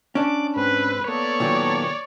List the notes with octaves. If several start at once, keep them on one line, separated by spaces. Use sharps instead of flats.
C#4 D4 D5 D6
G#2 C4 B4
A#3 B3 A4 C#5 D5
A#2 D#3 F#3